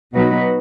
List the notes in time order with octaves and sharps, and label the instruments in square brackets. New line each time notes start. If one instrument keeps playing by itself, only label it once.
[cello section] B2 F#3 D#4 F#4 B4